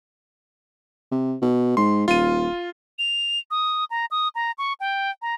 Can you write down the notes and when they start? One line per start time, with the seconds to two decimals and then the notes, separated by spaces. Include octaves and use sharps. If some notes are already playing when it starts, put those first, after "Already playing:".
1.11 C3
1.42 B2
1.77 G#2 C6
2.08 D#1 F4 D#7
2.99 F7
3.51 D#6
3.90 A#5
4.11 D#6
4.35 A#5
4.58 C#6
4.80 G5
5.22 A#5